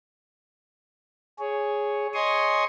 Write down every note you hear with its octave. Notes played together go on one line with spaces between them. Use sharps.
G#4 C#5
C#5 D#5 G#5 C6 C#6 D#6